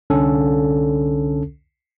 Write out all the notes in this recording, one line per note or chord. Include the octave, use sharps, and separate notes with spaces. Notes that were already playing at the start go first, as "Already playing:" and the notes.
C2 D3 C#4 A4